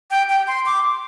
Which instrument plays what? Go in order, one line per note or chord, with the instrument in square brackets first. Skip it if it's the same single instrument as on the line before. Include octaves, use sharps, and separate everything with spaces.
[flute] G5
G5
C6
D6